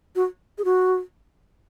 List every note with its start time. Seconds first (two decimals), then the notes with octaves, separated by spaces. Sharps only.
0.16 F#4
0.58 G#4
0.65 F#4